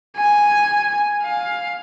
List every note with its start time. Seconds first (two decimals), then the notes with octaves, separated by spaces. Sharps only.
0.16 G#5
1.23 F5